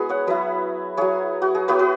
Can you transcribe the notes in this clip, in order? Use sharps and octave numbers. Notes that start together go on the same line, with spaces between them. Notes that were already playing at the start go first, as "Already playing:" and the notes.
Already playing: G#3 B3 E4 F#4 G#4 B4
C#5 F#5
F#3 E4 B4 E5
F#3 E4 G#4 C#5
F#4
G#4
F#3 B3 E4 F#4 B4
B4